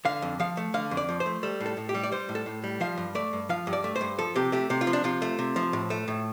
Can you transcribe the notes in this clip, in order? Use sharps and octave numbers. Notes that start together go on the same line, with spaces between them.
D3 F5
F2
F3 F5
A3
D3 F5
F2
D5
F3
C5
A3
G3 A4
A2
A4
A2
G4
G3
D5
G3 C5
A2
A4
A2
G3
F3 F5
G2
A3 D5
G2
F3 F5
G2
D5
A3
C5
G2
F3 A4
C3 G4
A3 G4
C3 G4
F4
F3
D4
C3 F4
A3
C3
F3
A2
A3
A2